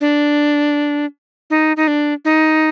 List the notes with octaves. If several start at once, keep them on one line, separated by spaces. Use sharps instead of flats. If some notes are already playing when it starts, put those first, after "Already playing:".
D4
D#4
D#4
D4
D#4